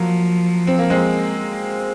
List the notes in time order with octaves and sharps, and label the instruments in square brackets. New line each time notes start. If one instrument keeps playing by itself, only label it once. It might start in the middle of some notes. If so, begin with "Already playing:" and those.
Already playing: [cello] F3 [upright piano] F#3 A#3
[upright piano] C4
A#3
G#3 C4